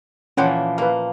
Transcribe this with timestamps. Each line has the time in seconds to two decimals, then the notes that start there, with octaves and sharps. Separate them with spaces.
0.37 A#2 E3 F3 C#4 F#5 G5
0.78 A#3 B4 F5